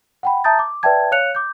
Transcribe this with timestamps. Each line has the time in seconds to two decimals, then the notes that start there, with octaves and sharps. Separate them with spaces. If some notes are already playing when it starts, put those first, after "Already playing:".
0.23 F#5 G5 B5
0.44 E5 A5 A#5 D#6 G6 A6
0.59 D6
0.83 B4 D5 E5 G5 A5 G#6
1.11 C#5 F5 F#6 C#7 F7
1.35 D6 G6